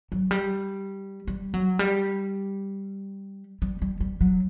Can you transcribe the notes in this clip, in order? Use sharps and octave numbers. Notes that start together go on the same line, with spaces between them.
F#3
G3
G3
F#3
G3
G3
G3
G3
F#3